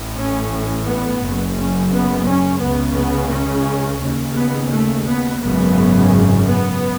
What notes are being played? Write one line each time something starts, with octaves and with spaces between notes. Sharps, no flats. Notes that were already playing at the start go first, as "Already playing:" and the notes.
Already playing: A1 A2
C#4
B3
F#1 F#2 C#3
C#4
B3
C#4
C#2 C#3 B3
B3
C#4
D#2 C#3
B3
A3
B3
G#1 F#2 C#3 B3
B3